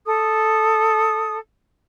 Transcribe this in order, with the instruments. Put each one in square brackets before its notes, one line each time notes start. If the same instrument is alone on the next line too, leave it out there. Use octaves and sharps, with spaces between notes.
[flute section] A4 D#6